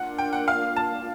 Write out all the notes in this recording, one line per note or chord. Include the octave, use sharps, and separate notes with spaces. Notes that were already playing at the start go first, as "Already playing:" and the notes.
Already playing: A#3 D4 F4 F#5
G5
F#5
F5
A5